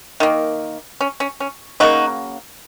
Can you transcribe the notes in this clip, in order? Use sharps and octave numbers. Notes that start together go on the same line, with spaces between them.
D#3 A#3
C#4
C#4
C#4
C#3 F#3 A#3 D#4 F#4